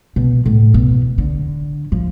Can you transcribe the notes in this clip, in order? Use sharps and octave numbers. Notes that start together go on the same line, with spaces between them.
B2
A2
B2
D3
F3